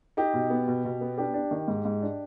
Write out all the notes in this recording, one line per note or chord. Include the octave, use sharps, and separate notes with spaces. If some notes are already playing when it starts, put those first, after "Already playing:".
D#4 G4
B2
B3
B2
B2
B3
D4 G4
D4
D#3
G#2
G#2
D4